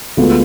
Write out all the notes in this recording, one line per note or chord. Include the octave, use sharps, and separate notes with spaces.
D2 D3 G#3 B3 F4